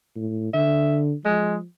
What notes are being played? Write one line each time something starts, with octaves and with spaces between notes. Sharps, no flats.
A2
D3 E5
F3 G#3